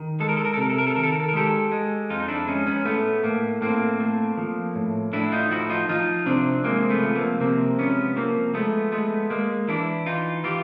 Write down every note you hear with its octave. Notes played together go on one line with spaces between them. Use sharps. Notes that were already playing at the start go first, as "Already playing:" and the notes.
Already playing: D#3
G#3 A4
A#4
A4
A#4
A4
C3 A#4
A4
A#4
A4
D#3 A#4
A4
A#4
A4
A#4
G#3 G4 A4
G#3
F2 D#4 F4
D#4
D4 E4
G#3 C#4 D#4
B3 C#4
A2 A3 B3
A2 A#3
A2 A#3 C4
A3
F3
A2
A2 D4 E4
D#4 F4
F3 E4 F#4
D#4 F4
F3 D#4 F4
C3 C4 D4
G#3 A#3 C4
A3 B3
F3
A#3 C4
C3 A#3 C4
G#3 B3 C#4
F3 A#3 C4
G#3 A3 B3
G#3 A3 B3
G#3 A#3
E3 D4 E4
E3 D#4 F4
E3 F4 G4